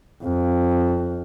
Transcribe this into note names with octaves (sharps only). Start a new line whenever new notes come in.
F2